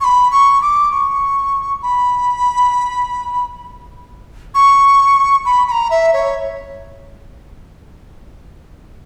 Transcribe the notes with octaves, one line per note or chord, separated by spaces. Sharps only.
C#6
B5
C#6
D6
C#6
B5
C#6
B5
B5
A#5
E5
C#5